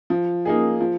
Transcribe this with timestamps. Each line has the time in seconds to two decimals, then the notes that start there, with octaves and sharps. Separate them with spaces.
0.10 F3
0.45 A#3 D#4 G#4
0.80 F3